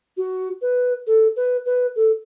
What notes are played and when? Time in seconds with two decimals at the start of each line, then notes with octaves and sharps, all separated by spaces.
0.17 F#4
0.62 B4
1.07 A4
1.36 B4
1.66 B4
1.96 A4